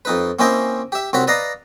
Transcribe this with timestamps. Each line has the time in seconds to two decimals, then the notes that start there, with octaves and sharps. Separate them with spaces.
0.05 F2 D#4 B4
0.39 A#3 C4 C#4 E4 D#5 G5
0.92 G4 E5
1.13 C2 C4 F#4 C#5 F#5 B5
1.27 B4 D5 D#5 F5 A#5